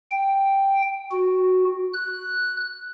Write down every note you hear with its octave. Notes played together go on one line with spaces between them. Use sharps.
G5
F#4
F#6